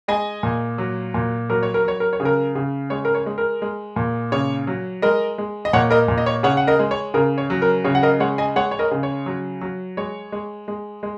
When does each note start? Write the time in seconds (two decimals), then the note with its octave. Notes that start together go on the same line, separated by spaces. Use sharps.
0.08 G#3 D#5 G#5
0.43 A#2
0.78 F#3
1.14 A#2
1.50 F#3 A#4
1.63 C#5
1.74 A#4
1.84 F#3 C#5
2.00 A#4
2.13 C#5
2.20 C#3
2.25 A#4
2.55 C#3
2.90 G#3 C#5
3.05 A#4
3.15 C#5
3.26 G#3
3.38 A#4
3.62 G#3
3.96 A#2
4.32 C#3 C#5
4.67 F#3
5.02 G#3 A#4 D#5
5.38 G#3
5.65 D#5
5.73 A#2 C#5 F#5
5.91 A#4 D#5
6.08 A#2
6.18 D#5
6.26 C#5
6.43 C#3 C#5 F#5
6.57 F#5
6.67 A#4 D#5
6.79 G#3
6.91 C#5
7.14 C#3 A#4
7.38 C#5
7.50 F#3
7.62 A#4
7.84 C#3 C#5
7.95 F#5
8.03 A#4 D#5
8.20 G#3 C#5 F#5
8.38 D#5 G#5
8.56 G#3 C#5 F#5
8.71 C#5
8.79 A#4 D#5
8.91 C#3
9.03 C#5
9.26 F#3
9.61 F#3
9.97 G#3 C#5
10.32 G#3
10.68 G#3
11.03 G#3